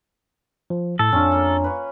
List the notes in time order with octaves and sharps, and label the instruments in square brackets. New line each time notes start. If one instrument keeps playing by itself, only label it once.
[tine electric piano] F3
[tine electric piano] A2 [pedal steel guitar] A4
[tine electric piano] F2 D4 [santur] C#4 F4
[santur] A#3 A#4
B4 C#5